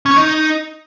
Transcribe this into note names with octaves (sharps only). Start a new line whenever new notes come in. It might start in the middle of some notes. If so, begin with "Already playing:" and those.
C#4
C#5
D#4